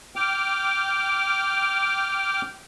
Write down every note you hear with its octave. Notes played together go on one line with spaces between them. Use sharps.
G5 D6 F6